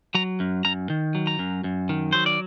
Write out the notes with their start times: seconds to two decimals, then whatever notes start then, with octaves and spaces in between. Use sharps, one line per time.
0.15 F#3 A#5
0.40 F#2
0.65 F#2 A#5
0.90 D#3
1.15 F#3
1.27 A#5
1.39 F#2
1.64 F#2
1.89 D#3
2.13 F#3 C5
2.26 D5